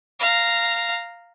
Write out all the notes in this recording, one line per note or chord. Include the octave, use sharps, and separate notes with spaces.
F5 A#5